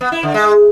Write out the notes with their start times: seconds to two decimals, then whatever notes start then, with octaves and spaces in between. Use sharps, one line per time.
0.01 B3
0.12 E4
0.23 D3
0.34 G#3